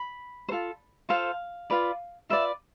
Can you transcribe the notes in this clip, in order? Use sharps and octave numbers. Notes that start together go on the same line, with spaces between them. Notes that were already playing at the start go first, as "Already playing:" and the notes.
Already playing: B5
C5
F4 A4
F4 A4 C5 F5
F4 B4 D5
F4 B4 D5 E5